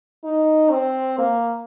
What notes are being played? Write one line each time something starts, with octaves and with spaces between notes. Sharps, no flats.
D#4
C4
A#3